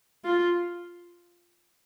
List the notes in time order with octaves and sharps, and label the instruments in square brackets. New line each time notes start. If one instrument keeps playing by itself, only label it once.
[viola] F4